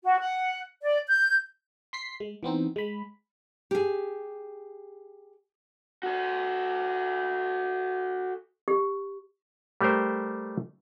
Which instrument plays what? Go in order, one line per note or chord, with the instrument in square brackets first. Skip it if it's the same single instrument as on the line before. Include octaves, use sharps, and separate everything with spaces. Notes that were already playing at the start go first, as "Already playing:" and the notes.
[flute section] F#4
F#5
D5
G6
[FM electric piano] C6 B6 C7
G#3
E3 B3 C4 D#4
G#3 B5
[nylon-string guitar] G4 G#4
[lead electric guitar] F#4 A4
[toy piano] G4
[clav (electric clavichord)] G3 A3 G4 A#4 C5